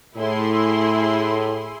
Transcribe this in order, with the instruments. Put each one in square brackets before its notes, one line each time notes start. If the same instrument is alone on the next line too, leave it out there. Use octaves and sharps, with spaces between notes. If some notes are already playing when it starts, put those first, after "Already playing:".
[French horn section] A2 [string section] E4 G#4 C6